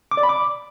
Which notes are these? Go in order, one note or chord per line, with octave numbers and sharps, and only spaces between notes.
D6
D5
B5
D6